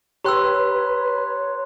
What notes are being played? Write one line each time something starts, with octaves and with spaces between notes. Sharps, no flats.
G4 B4 C#5 G5 A#5 C6 E6 F#6